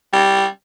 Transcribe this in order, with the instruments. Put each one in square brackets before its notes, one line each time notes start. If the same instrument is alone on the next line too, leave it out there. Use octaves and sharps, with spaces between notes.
[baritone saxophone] G3